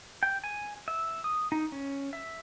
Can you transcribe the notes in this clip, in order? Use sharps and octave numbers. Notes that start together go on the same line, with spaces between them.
G5
G#5
E5
D#6
D#4
C#4
E5